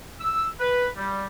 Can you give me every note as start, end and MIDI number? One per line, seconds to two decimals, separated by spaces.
0.20 0.46 88
0.60 0.87 71
0.96 1.27 55